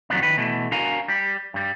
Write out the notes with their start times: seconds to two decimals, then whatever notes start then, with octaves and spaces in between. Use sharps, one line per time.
0.10 F2 D#3 F#3 B3 C4 D4
0.22 D#3 B4
0.37 B2 E3 A3
0.72 D4 F#4 A#4 F5 G#5 A#5
1.08 G3 G4
1.54 G2 G3